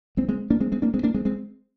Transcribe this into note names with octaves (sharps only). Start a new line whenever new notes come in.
G#3 C4
G#3 C4
A#3 D4
G#3 C4
G#3 C4
A#3 D4
G#3 C4
A#3 D4
G#3 C4
G#3 C4